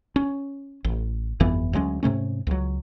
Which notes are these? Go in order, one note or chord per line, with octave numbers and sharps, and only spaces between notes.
C#4
A1
G1 F2 E3 B3
D2 F#3 G#3 C#4
G#2 C3 A3 C#4
C#2 F#3